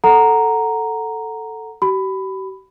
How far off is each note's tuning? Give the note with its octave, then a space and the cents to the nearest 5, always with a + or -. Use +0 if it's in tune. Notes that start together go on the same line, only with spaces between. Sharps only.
A4 +0 F#5 +0 A#5 +0
G4 -45 B5 +15